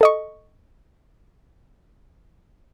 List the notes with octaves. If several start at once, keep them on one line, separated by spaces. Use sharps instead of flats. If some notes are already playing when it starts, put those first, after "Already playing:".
A4 D#5 C#6